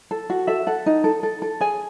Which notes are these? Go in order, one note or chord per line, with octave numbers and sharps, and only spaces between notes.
A4
F#4
A4 E5
A4 F#5
D#4
A4
A4
A4
G#4 G#5